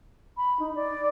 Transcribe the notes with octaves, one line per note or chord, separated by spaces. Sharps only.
B5
D#4
D5